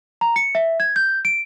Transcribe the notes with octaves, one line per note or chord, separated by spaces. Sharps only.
A#5
C#7
E5
G#6
G6
D7